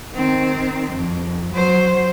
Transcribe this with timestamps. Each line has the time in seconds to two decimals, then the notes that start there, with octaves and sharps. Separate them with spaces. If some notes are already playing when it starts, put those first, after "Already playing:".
0.12 D#3 C4
0.93 F2
1.54 F#3 C5